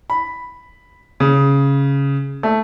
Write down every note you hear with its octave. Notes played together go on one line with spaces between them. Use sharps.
B5
C#3
A3